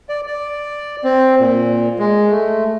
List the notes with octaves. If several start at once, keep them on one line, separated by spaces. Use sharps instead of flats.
D5
D5
C4
A#2
G#3
A3